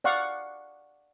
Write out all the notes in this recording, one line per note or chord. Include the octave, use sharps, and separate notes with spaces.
D5 F5 F#5 C#6